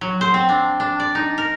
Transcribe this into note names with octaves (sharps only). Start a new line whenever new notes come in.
F#3
C5
C4
D4
D4
D5
D#4
A#4